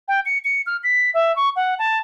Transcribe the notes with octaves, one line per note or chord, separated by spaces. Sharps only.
G5
C#7
C#7
F6
B6
E5
C#6
F#5
A5